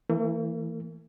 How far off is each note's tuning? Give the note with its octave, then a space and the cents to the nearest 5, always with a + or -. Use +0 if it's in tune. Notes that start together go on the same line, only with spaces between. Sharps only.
E3 +0 A#3 -45